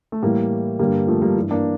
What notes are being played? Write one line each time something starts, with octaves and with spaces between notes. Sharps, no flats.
A3
A2 E3 G3 A#3
G2 D3 G3 A#3
F3 A3
G3 A#3
G2 E3
A#3 D4